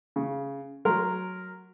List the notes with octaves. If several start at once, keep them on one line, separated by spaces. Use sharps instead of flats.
C#3
F#3 A#4 C6